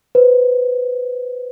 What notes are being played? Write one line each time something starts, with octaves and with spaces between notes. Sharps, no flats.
B4 C5